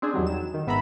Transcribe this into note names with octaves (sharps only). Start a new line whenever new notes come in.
C4 D4 G#4
E2 D#3 F#3 G3
E7
D#3
G#1 G#2 B3 E5 A#5 B5